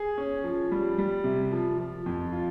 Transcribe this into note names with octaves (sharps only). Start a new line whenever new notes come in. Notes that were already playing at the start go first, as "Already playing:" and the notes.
Already playing: G#4
C#4
F3
G3
G3
C3
F3
F3
F2
F4